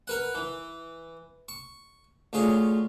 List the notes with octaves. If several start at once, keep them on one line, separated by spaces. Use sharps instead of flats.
A#4 B4 F#5
E3
C#6
D2 F4 G#4 C#5